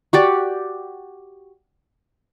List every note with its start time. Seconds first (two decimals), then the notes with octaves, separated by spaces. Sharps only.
0.13 F#4 G4 D5